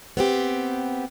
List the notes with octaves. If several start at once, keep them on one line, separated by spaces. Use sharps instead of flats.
B3 C4 G4